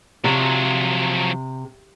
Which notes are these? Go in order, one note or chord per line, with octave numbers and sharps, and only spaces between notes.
C3 F3 F#3